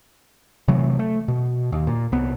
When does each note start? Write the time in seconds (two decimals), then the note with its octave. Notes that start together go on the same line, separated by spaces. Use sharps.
0.68 C3 E3 F#3 A3
0.99 A3
1.28 B2
1.72 D#2
1.87 A#2
2.12 C2 B3